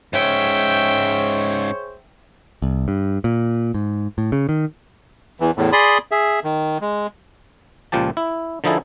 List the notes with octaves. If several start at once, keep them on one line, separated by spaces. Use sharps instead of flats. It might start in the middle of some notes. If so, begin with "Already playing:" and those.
G#2 C#4 G#4 C5 C#5 E5 G5
C2
G2
A#2
G#2
A2
C#3
D#3
E2 E3
E2 A2
G#4 D5 B5 C6 D#6
G#4 E5
D#3
G#3
C#2 A#2 F3 G4 A5
E4
D3 F3 D#4 E4 G#4 A4